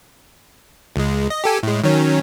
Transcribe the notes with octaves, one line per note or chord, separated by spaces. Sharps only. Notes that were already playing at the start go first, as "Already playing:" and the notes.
C#2 G#3
D#5
G4 A4 G#5
A2 G#3
D#3 F#3 C#4